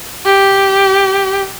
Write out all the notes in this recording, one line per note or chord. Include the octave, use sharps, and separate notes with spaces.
G4